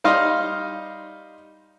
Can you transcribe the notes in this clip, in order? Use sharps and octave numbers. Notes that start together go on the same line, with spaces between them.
G3 D#4 D#5 F5 C6